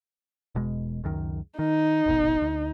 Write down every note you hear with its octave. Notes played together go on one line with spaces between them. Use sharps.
E1 B2 G#3
C#2 F#2 D#3
D#3 D#4
D#1 G#1 B2
D2